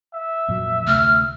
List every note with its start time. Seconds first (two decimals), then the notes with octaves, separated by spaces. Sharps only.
0.14 E5
0.49 F2 A#2 F#3
0.87 D2 C3 A3 F6